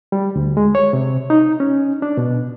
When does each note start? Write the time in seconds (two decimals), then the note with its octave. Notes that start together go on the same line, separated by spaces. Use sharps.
0.12 G3
0.36 D2
0.57 G#3
0.75 C#5
0.93 C3
1.30 D#4
1.60 C#4
2.02 D4
2.17 B2